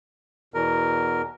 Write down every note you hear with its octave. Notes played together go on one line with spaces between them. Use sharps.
E2 B2 A#4